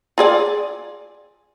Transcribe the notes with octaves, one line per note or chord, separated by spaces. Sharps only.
F4 G#4 D5